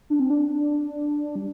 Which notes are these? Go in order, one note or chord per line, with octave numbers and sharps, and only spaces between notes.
D4
C4
D4
G3